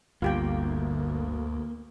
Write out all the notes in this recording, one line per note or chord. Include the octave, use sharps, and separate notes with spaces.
G1 D2 A#3 F4 G4 G5